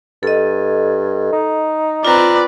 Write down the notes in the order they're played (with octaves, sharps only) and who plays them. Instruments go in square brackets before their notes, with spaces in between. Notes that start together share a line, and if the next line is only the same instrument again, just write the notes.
[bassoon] G2 [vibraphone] A4 D#5
[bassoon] D#4
[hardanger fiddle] C4 A#5 [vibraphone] F4 [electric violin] B4 D5